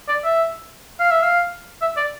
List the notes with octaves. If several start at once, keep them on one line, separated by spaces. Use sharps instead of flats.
D5
E5
F5
E5
F5
E5
D5